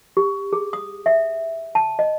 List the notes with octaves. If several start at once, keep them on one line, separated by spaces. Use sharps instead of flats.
G4
G#4
D#6
E5
A5
D#5